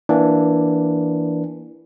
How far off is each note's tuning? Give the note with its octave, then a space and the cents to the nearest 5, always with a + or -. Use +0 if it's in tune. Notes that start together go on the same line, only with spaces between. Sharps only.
E3 +0 A#3 +20 D4 +0